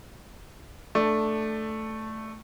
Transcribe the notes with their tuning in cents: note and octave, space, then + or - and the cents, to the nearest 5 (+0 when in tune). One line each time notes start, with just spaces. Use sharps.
A3 +0 D4 +10